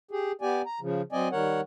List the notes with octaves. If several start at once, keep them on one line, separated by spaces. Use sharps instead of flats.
G4 G#4
B3 G4 D5 G#5
A#5
C#3 F3
F#3 C4 D5 D#5 G#5
D#3 G3 A#4 C#5 F#5